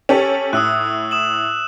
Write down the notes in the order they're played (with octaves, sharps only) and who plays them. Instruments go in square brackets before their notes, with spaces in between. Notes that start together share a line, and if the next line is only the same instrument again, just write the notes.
[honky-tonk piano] C#4 G4 A4 [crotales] F#7
[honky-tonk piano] A2 [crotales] D#6 E6 F#6
[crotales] D#6 E7 F#7